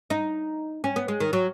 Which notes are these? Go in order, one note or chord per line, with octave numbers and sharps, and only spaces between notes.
D#4
C#4
B3
G#3
D#3
F#3